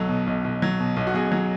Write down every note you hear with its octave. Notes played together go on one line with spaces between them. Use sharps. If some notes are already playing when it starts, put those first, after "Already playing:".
Already playing: B1 F#3 A4
B2
B1
B1
F#3
B2
B1
F#4
B1 G#4
F#3